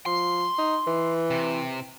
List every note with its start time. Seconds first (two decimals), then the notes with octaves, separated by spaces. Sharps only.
0.06 F3 C6
0.58 D#4
0.87 E3
1.30 C3